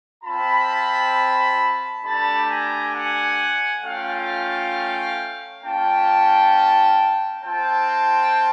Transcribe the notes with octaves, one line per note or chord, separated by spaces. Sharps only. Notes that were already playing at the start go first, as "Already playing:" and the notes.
C4 F4 A5 B5
A3 D4 G4 A5 B5
G#5 A#5
F#5 G#5
A3 C#4 F4 F5 G5
A#3 C#4 F4 G5 A5
C4 F4 G5 A5